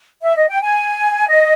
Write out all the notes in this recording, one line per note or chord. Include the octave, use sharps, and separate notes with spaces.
E5
D#5
G5
G#5
D#5